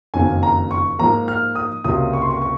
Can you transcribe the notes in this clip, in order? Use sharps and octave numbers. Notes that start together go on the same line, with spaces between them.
F#1 F2 D#3 A#3 G#5
A#5
C#6
G#2 F3 A#3 A#5
F6
D#6
C#2 C3 F#3 A#3 D#6
C#6
C6
C#6
C#6